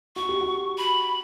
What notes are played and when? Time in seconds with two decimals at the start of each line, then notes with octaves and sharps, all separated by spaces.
0.16 F#4 C#6
0.29 G4
0.41 F#4
0.78 B5